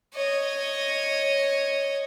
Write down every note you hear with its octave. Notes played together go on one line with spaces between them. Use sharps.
C#5 D#5